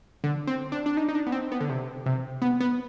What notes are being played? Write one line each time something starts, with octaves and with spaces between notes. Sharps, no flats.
D3
C4
D4
D4
D#4
D#4
D4
B3
C4
B3
D3
C3
C3
B3
B3